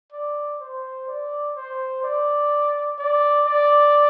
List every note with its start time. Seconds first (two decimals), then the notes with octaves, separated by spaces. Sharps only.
0.12 D5
0.60 C5
1.08 D5
1.56 C5
2.04 D5
2.99 D5
3.47 D5